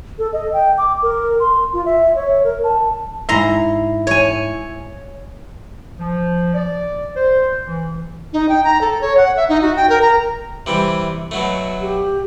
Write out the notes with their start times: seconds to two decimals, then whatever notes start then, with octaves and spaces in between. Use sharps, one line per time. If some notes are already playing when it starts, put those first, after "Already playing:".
0.19 A4
0.33 D#5
0.53 G5
0.78 D6
1.02 A#4
1.40 C6
1.73 F4
1.86 E5
2.16 C#5
2.44 A#4
2.64 A5
3.29 G#2 E4 E5 A#5 C6
4.07 C#5 G#5
5.99 F3
6.54 D5
7.16 C5
7.67 E3
8.33 D#4
8.49 G5
8.64 A#5
8.81 A4
9.01 C#5
9.17 F#5
9.36 E5
9.49 D#4
9.62 F#4
9.76 G5
9.89 A#4
10.02 A#5
10.66 C3 E3 G3
11.31 B2 F#3 A3
11.81 G4